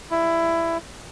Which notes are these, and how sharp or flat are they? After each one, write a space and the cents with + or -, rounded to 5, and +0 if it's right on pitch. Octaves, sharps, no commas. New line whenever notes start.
G3 +30 E4 +15